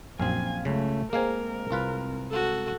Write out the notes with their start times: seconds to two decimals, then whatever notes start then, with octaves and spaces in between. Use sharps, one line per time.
0.20 A#1 F#2 C4 F5 G#5
0.65 C#2 C#3 A3
1.13 G#3 A#3 C4 A#4 F5 G#5
1.71 C2 F4 B4
2.31 F#4 A4